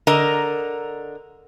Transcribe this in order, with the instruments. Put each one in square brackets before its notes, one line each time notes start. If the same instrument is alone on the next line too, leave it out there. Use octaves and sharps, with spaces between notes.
[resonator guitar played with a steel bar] D3 A#4 D#5 A#5